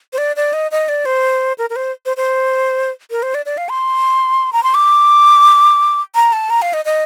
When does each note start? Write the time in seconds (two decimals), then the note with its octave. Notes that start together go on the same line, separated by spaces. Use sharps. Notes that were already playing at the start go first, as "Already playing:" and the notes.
0.13 C5
0.18 D5
0.36 D5
0.53 D#5
0.71 D#5
0.89 D5
1.05 C5
1.58 A#4
1.70 A#4
1.76 C5
2.06 C5
2.17 C5
3.11 A#4
3.23 C5
3.34 D5
3.46 D5
3.57 F5
3.69 C6
4.53 A#5
4.63 C6
4.74 D6
6.15 A#5
6.33 A5
6.50 A#5
6.62 F5
6.73 D#5
6.85 D#5